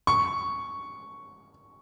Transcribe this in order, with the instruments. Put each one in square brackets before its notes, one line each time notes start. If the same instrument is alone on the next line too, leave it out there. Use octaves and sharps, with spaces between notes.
[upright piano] C#6